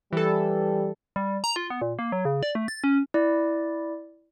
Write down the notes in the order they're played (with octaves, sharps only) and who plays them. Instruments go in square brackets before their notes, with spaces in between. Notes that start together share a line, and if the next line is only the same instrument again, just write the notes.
[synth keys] E3 A4 [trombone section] G3
[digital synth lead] G3
A#5
F4
B3
A#2
A#3
F#3
C#3
D5
A3
A6
C#4
[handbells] E4 D5